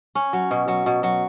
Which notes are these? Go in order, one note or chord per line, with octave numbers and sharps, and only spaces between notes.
C#4
F#3
B2
F#3
B2
F#3